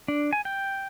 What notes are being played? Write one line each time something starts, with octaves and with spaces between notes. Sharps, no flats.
D4
G#5
G5